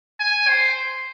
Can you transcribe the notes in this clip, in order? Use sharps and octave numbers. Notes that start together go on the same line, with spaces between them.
G#5
C5